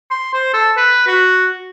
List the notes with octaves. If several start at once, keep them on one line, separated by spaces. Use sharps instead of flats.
C6
C5
A4
B4
F#4